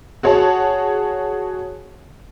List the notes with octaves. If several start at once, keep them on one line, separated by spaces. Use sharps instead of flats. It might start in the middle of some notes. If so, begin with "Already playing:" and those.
F#4 G#4 C#5 F#5 A5